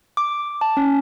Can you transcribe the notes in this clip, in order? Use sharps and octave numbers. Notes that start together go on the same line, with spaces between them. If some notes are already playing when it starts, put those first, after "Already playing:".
D6
A5
C#4